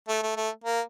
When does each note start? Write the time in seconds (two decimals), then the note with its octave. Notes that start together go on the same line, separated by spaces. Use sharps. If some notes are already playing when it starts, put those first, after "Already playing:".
0.09 A3
0.23 A3
0.36 A3
0.64 A#3